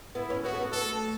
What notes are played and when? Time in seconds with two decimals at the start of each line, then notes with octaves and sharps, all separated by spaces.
0.15 B3 E4
0.30 C#4
0.44 B3 F#4
0.53 A3
0.63 B3
0.72 A3 A4